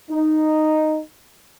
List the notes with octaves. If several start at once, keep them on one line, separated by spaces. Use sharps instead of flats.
D#4